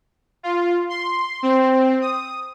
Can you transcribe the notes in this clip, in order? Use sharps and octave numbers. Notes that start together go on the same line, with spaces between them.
F4
C6
C4
D#6